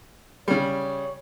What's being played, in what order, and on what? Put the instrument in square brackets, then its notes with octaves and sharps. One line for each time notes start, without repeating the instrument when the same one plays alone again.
[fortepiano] C#3 G3 [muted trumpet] C#5